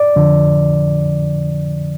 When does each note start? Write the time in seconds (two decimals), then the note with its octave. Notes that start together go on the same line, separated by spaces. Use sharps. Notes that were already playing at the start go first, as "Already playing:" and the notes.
Already playing: D5
0.16 F2 D3 F3